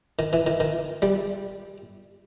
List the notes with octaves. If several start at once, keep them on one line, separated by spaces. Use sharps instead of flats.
D#3
E3
D#3
D#3
G3